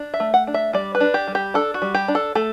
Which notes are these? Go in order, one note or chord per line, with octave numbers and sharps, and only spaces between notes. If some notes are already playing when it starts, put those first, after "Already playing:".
Already playing: D4
E5
A3
F#5
D4
E5
G3 D5
B4
D4
G4
G3
G4
D4 A4
F#4
G3
G4
D4
A4
A3 A4